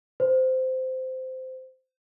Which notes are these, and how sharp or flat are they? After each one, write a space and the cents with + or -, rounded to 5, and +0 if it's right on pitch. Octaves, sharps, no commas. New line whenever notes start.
C5 -15